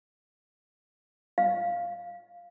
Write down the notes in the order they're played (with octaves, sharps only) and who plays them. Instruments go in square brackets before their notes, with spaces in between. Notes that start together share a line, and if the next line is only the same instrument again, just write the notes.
[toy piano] F5